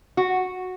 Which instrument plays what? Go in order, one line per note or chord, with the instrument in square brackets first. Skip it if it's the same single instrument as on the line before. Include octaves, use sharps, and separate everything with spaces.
[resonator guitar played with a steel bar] F#4